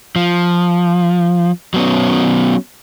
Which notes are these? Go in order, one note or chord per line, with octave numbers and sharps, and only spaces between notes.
F3
F#3 B3 C#4